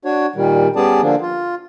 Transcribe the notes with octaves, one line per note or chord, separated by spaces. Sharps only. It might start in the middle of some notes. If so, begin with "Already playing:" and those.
D4 F#4 C#5
A#2 D#3 G3
G3 B3 C#4 G#4 D5 A5
D3 F3 A#3 D4
F4